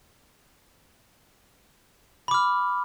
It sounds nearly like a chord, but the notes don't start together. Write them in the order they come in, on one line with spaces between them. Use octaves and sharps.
B5 D6 F6